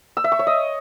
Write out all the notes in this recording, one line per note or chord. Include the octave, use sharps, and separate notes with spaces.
E6
E5
C#6
C#5
D#5